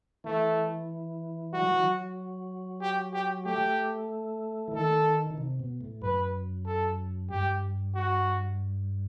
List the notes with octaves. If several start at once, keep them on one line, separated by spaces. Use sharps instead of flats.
E3 A3
G3 F#4
F#3
E3
F#3
G4
G4
A3 G4
E3
D#3 A4
D#3
C3
B2
A2
F#2 B4
A4
G2 G4
F#4